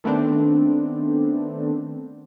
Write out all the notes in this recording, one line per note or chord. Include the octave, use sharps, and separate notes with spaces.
D#3 A3 B3 C4 D4